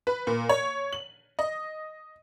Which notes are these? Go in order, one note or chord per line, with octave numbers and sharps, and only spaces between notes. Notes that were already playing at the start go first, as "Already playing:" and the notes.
B4
A#2
C#5
F#7
D#5